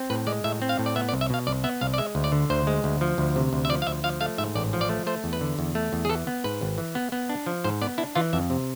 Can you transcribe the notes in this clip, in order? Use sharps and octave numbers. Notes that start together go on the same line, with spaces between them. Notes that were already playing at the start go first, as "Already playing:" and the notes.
Already playing: C4
A2 B4
G#3 D5
A2 E5
C4
F5
A2
D5
B3 E5
D5
C2
E5
B2 F5
C2 D5
B3 E5
C2 F5
D5
G#3 E5
D2
D5
D3
D2 C5
G#3
D2
F3
D2
C3
D2
E5
F3 D5
F5
D2 E5
F3 F5
A3 F5
G#2 E5
A1 D5
F3
D5
A3
A3 C5
E2
B4
D3
E2
A3
E2
G#4
E3 A4
B3
G#2 B4
G#1
E3
B3
B3
D4
F3
G#2 C5
B3 D5
D4 E4
E3 F4
F2 E5
C3